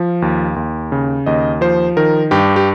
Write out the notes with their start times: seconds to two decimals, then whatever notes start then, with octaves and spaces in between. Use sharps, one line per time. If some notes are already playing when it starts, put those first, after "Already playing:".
Already playing: F3 F5
0.22 D#2
0.56 D#2
0.92 C#3
1.26 D#2 D#5
1.61 F3 C5
1.97 D#3 A#4
2.31 G2 G4
2.56 G4